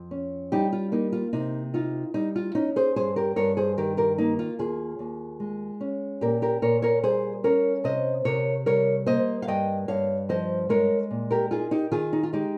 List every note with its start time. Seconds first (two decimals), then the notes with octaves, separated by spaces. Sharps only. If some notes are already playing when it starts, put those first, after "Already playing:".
Already playing: F2
0.11 C#4
0.52 G3 D#4 G4
0.73 F4
0.92 A#3 D#4
1.13 F4
1.33 C3 D#4
1.74 D#4 F4
2.14 G3 D#4
2.36 F4
2.55 C#4 D#4
2.76 G#4 C5
2.96 G2 G#4 C5
3.16 G4 A#4
3.36 G2 A#4 C#5
3.57 G#4 C5
3.77 D#3 G4 A#4
3.97 G4 A#4
4.18 A#3 D#4
4.39 F4
4.59 D#2 F4 G#4
4.99 D#2
5.40 G#3
5.81 C#4
6.21 A#2 G4 A#4
6.42 G4 A#4
6.62 A#2 A#4 C#5
6.82 A#4 C#5
7.04 G3 G#4 C5
7.44 C#4 A#4 C#5
7.84 C3 C5 D#5
8.25 C3 A#4 C#5
8.66 G3 A#4 C#5
9.06 A#3 C5 D#5
9.42 F5
9.47 G2 D#5 G5
9.88 G2 C#5 F5
10.29 F3 C5 D#5
10.69 G#3 A#4 C#5
11.11 A#2
11.31 G4 A#4
11.51 D#4 F4 G#4
11.71 D#4 G4
11.91 D#3 F4 G#4
12.13 D#4
12.23 F4
12.33 G#3 D#4 G4